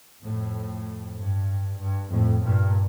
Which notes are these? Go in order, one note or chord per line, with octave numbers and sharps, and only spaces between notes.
F2 A2
G2
G2
F2 A2
G2 A#2